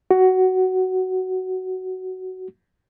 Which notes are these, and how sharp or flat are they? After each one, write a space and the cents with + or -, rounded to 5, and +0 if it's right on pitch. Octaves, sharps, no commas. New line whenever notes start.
F#4 +10